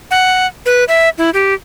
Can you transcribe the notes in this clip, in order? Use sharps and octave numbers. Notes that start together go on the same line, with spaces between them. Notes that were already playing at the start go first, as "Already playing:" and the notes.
F#5
B4
E5
E4
G4